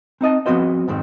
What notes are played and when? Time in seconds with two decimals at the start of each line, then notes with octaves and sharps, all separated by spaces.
0.21 C4 D#4 D#5 A5
0.46 F3 B3 C4 F#4 C5 D#5
0.88 F2 G#2 D#3 C4